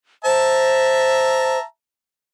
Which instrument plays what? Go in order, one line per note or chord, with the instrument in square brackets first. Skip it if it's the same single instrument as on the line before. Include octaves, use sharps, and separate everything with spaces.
[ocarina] C5 [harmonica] E5 A5 A#5